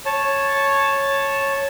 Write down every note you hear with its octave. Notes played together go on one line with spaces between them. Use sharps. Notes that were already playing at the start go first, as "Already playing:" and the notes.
C#5 A5